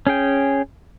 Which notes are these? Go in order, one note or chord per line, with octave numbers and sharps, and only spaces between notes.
C#4 G#4 G5